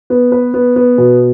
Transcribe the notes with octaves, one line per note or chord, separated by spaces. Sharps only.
B3
B4
B3
B3
B2